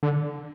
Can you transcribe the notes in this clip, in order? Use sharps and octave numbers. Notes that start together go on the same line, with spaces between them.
D3